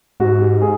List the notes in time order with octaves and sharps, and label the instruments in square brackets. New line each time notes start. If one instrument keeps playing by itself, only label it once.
[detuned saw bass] G#2 [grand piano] F#4
[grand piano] G4
G#4